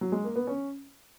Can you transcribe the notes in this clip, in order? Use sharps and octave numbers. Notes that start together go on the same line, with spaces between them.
F#3
G#3
A#3
B3
C#4